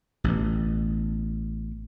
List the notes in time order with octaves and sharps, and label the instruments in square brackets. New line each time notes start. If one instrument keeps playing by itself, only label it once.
[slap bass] A1 B2